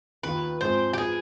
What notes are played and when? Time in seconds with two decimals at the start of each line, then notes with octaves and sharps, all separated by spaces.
0.23 D#2 D#3 B3 F4 B4
0.61 G#2 F3 G#3 C4 C5
0.93 G4
0.98 F3 B3 G#4